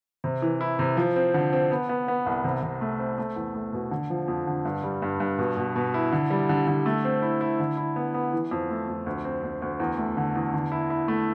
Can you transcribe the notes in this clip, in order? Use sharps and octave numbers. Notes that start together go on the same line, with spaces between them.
C3
E3
E4
C3
F3
C4
D3
C4
B3
B3
B3
C2
C3
C3
A3
C4
A3
E2
A3
B2
D3
F3
F2
D3
G2
G3
G2
G2
B2
B2
B2
E4
D3
G3
D3
D3
A3
C4
E4
E4
D3
E4
B3
B3
E3
F2
A3
F2
D2
C4
D2
D2
E2
A3
D3
E2
D3
E4
E4
A3